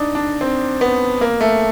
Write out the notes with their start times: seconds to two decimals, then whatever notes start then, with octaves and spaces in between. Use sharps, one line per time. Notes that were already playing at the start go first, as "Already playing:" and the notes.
Already playing: D4 D#4
0.15 D4
0.41 C4
0.81 B3
1.21 A#3
1.41 A3